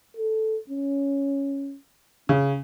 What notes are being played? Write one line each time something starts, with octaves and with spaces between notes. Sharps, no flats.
A4
C#4
C#3 C#4